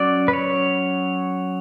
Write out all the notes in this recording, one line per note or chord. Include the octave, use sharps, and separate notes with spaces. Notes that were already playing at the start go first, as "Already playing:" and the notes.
Already playing: F#3 C#4 D5
B4
C#5